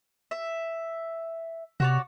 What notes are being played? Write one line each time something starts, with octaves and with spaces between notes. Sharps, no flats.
E5
C3 F#4 C#5 D5